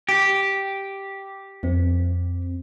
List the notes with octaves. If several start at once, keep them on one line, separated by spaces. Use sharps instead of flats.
G4
F2 C4